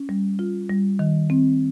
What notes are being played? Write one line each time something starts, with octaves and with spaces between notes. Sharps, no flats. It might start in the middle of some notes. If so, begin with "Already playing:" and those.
Already playing: C#4
G3
F4
G3
D#3
C4